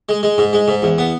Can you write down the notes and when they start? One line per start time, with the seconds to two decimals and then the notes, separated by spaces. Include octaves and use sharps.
0.09 G#3
0.23 G#3
0.38 G#2
0.53 G#3
0.68 G#2
0.82 E2
0.98 B3